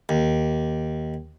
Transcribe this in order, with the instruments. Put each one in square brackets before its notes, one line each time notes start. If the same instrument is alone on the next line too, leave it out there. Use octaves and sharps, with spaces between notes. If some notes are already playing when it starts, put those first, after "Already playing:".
[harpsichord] D#2